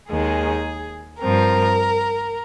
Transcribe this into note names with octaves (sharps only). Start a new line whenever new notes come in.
D#2 D#3 G#3 G#4
G2 F3 C4 A#4